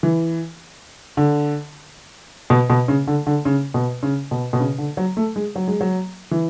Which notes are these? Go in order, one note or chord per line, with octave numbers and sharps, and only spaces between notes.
E3
D3
B2
B2
C#3
D3
D3
C#3
B2
C#3
B2
B2
C#3
D3
F#3
A3
G#3
F#3
G#3
F#3
E3